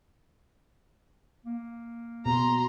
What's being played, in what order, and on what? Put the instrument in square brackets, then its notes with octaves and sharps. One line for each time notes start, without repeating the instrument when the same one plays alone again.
[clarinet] A#3
[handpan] B2 [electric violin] A#5 C6